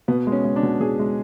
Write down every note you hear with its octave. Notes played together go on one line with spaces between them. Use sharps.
B2 B3
G#3
C#4
G#3
D4
B2
B2 G#4
G#3